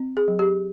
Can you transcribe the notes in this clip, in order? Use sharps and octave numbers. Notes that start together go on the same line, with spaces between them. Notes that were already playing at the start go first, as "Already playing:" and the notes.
Already playing: C4
G#4
F#3
G4